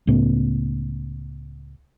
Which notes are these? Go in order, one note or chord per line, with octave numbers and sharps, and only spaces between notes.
C#2 A2 A3 B3